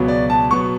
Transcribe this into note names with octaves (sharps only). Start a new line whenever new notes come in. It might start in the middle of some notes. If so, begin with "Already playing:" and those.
Already playing: C#2 B2 F#3 B3
D5
A5
B2 F#3 B3 C#6